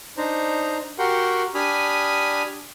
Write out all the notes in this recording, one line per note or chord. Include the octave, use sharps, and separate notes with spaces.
D4 D#4 C5 A#5
F#4 G4 A#4 F#5 G5 C6
D4 G4 G#5 B5 D#6 F6